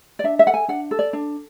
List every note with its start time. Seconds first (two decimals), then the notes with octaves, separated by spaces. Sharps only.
0.19 D5
0.24 D4 E5
0.39 E5
0.46 A4 F#5
0.54 G#5
0.68 D4 F#5
0.91 A4
0.99 D5
1.13 D4